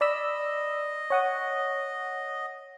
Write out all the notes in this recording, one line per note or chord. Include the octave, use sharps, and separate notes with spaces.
D5 D#5 B5 E6
C#5 F#5 D#6